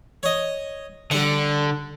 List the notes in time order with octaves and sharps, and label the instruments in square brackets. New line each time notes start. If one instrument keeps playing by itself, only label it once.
[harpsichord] C#5 D#5
[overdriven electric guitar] D3 [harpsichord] G3 F#5